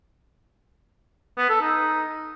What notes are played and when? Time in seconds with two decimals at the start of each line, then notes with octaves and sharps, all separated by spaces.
1.37 B3
1.49 A4
1.61 D#4